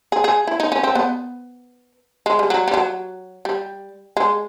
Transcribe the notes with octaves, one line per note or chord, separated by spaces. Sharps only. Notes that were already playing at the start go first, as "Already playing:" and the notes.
G#4
G#4
E4
D#4
C#4
C4
B3
G#3
G3
F#3
G3
F#3
G3
G#3